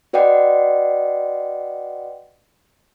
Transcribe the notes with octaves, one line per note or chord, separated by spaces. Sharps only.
F#4 B4 D5 D#5 F#5 G5